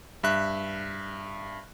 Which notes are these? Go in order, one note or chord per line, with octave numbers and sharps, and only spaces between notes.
G2 E5 F#6